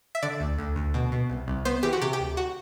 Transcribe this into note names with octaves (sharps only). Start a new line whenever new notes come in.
E5
D3 D5
D2
D2
D2
B2
B2
C2
C2
B3 C5
E3 G4
F#4
C3 G4
G4
D2
F#4